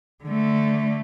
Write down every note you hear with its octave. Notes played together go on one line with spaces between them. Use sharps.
D3 A3